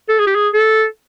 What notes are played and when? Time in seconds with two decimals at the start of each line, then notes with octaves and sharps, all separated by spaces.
0.09 A4
0.19 G#4
0.27 G4
0.35 G#4
0.54 A4